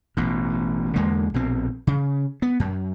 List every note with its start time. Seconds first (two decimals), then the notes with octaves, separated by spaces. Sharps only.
0.17 A1 B2
0.96 E2 D3 G#3 A#3
1.34 A#1 B2 C4
1.87 C#3
2.42 B3
2.60 F#2